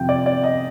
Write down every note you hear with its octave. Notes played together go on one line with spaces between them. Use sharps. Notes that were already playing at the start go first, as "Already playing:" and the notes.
Already playing: F2 C3 F3 G5
D5
D5
D#5